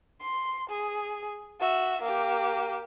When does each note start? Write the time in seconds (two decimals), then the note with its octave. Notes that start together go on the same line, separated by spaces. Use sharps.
0.21 C6
0.69 G#4
1.60 F#4 E5
2.02 A#3 G4